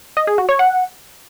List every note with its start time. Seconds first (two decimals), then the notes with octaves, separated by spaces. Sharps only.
0.17 D#5
0.27 G#4
0.38 F#4
0.49 C#5
0.59 F#5